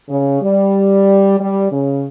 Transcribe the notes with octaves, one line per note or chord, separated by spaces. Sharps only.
C#3
G3
G3
C#3